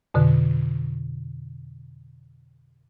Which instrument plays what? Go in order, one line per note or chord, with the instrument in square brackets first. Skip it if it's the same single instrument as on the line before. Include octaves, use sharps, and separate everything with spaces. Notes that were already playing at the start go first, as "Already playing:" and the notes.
[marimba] F2 B2 D3